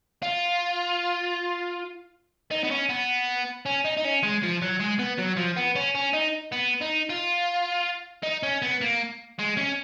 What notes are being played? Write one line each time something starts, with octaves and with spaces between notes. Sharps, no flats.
F4
D#4
B3
C#4
B3
C#4
D#4
D#4
C#4
G#3
F3
F#3
G#3
B3
F#3
F3
B3
C#4
C#4
D#4
B3
D#4
F4
D#4
C#4
B3
A#3
G#3
C#4